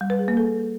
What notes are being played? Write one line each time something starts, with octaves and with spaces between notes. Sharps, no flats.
G3
B4
G#4
A#3
A4